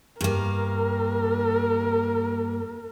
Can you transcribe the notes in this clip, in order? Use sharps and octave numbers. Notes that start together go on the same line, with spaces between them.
G2 A#3 A#4